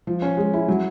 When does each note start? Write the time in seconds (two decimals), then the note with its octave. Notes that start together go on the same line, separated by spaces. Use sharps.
0.07 F3
0.22 C#4
0.37 G#3
0.53 E4
0.68 F#3